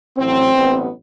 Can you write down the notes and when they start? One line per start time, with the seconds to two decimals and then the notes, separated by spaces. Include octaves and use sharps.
0.18 A1 A2 F#3 C4
0.54 A1 G2 F#3 B3